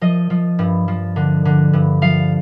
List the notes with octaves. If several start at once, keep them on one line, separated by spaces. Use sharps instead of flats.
F3 D#5
F3
G2
F3
D3
D3
G2
F3 F5